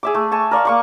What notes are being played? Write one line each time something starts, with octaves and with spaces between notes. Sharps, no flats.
G#4 E5 D6
A3
G#5 A5 C#6
A#4 D5 F5 C#6
A#3 C#6 D6